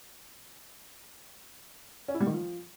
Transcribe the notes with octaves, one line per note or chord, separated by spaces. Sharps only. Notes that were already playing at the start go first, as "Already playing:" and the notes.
C#4
E4
G3
D#3
F3